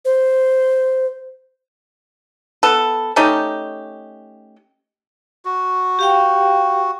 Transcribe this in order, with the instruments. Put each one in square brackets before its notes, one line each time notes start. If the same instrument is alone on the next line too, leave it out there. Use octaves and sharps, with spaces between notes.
[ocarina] C5
[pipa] B3 A4
A3 C#4 D#4 G4
[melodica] F#4
[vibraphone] G4 F5 G5